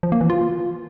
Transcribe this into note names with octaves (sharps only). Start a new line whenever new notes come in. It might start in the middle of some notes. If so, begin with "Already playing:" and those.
F3
A#3
E3
F4